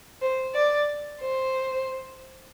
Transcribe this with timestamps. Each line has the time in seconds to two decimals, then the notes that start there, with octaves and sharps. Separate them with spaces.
0.21 C5
0.54 D5
1.21 C5